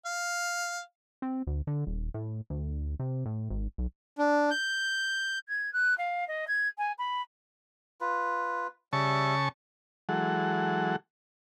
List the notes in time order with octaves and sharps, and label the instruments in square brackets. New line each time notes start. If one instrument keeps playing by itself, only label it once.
[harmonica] F5
[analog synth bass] C4
D2
D3
D#1
A2
D2
C3
A2
G#1
B1
[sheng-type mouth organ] D4
G6
[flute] G#6
F#6
F5
D#5
G#6
G#5
B5
[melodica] F4 B4
[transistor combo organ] C#3 A5 C#6 [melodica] G3 E5
[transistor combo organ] E3 F#3 G#3 A4 F#5